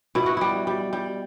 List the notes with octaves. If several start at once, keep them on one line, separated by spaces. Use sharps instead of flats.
B2 E4
F#4
G3 E4
G3
G3